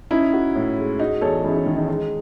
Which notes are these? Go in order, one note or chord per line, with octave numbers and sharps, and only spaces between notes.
C#4 D#4 E4
F#4
A2
G#3
G#3 D#4 F#4
E2 A4 C#5
E2 C#4 E4
D#4
D#3
D#4
G#3 D#4